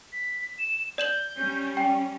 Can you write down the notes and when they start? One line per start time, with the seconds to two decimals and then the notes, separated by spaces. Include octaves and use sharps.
0.13 B6
0.59 E7
0.98 D5 G6 E7 F#7
1.37 G3 C#4
1.77 G5